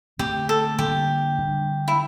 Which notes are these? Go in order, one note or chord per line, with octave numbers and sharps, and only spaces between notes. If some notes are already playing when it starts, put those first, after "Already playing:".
D3 A3 C4 G4
A4
D3 G3 A#3 D4 G4
D3 G3 D4
E4